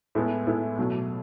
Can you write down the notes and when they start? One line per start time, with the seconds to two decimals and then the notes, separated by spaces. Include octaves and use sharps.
0.15 A2 G#3 B3 E4
0.47 A2 G#3 B3 E4
0.77 B2 F#3 A3